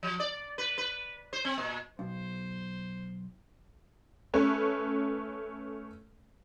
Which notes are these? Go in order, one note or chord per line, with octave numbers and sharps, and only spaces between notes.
F3
D5
B4
B4
C5
C4
A#2
B1 C5
A3 C#4 B4